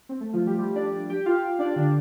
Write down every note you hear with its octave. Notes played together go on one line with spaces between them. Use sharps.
C4
A3
F3 F4
G3 G4
G3 G4
D4 D5
D4 D5
G4 G5
F4 F5
D4 D5
D3 D4